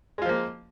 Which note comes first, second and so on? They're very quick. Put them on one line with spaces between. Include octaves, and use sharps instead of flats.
G#3 F4 F3 A#3